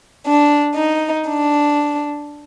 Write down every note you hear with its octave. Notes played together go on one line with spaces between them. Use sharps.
D4
D#4
D4